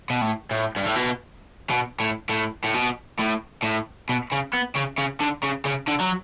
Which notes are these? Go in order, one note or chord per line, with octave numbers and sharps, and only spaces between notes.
B2
A2
A2
G2
A2
B2
B2
A2
A2
A2
B2
A2
A2
B2
C#3
B3
C#3
C#3
D3
C#3
C#3
D3
F#3